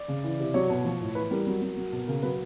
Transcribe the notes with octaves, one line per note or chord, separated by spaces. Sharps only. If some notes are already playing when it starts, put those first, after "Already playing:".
Already playing: D5
C#3
E3
C3
F#3 C#5
B2
F3
A2
E3 B4
G3 A#4
F#3
F#3
F#3
B2
C#3 A#4
F#3 B4